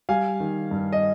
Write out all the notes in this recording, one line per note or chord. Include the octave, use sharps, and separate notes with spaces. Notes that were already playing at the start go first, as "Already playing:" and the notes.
G3 F5 G#5
D#3
G2
D#5